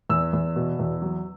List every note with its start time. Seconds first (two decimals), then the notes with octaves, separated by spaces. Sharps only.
0.10 E2 E6
0.33 E2
0.56 B2
0.79 E2
1.02 F#3